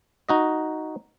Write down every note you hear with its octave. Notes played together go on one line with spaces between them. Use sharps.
D#4 F#4 D#5